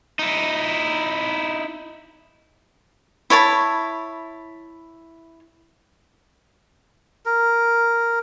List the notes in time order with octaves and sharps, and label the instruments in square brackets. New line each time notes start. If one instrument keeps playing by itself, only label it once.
[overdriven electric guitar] D#4 E4
[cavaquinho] E4 C#5 A5 B5
[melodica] A#4